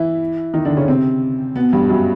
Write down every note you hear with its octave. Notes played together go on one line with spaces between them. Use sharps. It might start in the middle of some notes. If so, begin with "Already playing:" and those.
Already playing: E3 E4
D#3 D#4
D3 D4
C#3 C#4
C3 C4
B2 B3
G2 G3
F#2 F#3